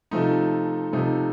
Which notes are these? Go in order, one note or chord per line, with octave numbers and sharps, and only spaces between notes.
C3 F3 A3 D#4
C3 F3 A3 D#4